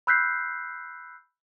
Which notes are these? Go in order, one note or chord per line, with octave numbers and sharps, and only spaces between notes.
B5 E6 F#6 G6 B6 C7